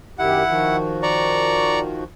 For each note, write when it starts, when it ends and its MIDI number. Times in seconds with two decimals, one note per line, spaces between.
0.19 0.43 42
0.19 0.43 51
0.19 0.76 64
0.19 0.43 67
0.19 0.76 78
0.47 2.04 51
0.47 2.04 53
0.47 2.04 66
1.03 1.79 74
1.03 1.79 82
1.03 1.79 85